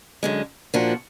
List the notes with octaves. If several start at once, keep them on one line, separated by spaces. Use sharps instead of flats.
F#2 D3 G#3
A#2 F3 A#3 D4 F#4